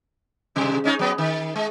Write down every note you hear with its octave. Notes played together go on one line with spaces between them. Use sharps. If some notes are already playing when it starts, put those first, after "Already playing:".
G#2 C3 G3
G#3 C#4 D#4
F#3 B3
D#3
G#3